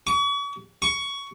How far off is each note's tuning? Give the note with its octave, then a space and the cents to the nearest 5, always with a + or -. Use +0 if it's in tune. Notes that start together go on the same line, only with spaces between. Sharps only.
C#6 +40
C#6 +15